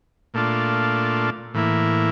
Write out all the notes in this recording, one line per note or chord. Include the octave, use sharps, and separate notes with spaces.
A#2 A3 D4 F4
A2 E3 A#3 E4